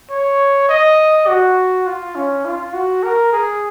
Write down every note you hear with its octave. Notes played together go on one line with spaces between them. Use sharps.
C#5
D#5
F#4
F4
C#4
F4
F#4
A#4
G#4